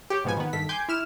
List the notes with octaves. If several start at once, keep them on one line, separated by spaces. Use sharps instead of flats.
G4 C#5
G#2 B2 F3 B3 G#5
D#3 B3
G2 D#3 A4 B6
G5 G#5 C6 D6 G6 G#6
E4 F6 E7